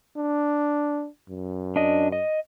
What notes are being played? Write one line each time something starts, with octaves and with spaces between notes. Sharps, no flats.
D4
F#2
D4 D#5
D#5